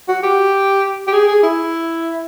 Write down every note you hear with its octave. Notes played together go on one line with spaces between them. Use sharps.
F#4
G4
G4
G#4
G#4
E4